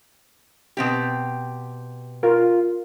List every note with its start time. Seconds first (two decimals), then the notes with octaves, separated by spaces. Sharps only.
0.77 B2 C4 G4
2.23 F4 A#4